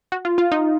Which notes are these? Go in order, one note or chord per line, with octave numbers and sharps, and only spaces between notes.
F#4
F4
F4
D#4